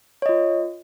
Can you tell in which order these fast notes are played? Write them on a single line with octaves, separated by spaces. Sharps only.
C#5 D#5 F4